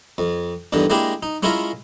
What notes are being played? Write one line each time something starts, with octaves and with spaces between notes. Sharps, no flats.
F2
E2 G2 D3 D#3
G#3 A#3 D4 E4 G4 G#4
D#4
G#3 C#4 E4 F4 A#4 E5